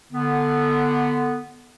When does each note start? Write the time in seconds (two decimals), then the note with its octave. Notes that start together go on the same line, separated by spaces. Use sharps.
0.12 D3 B3